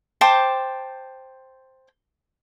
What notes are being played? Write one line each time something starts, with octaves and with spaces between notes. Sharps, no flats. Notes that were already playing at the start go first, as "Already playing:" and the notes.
C5 G5 A5 D6